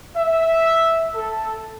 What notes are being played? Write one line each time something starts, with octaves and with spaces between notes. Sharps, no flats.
E5
A4